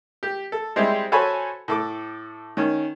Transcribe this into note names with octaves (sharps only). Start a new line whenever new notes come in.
G4
A4
G3 G#3 C4 E4 G4
F#4 A4 C5 C#5 G#5 B5
A2 A4 D6
D#3 C#4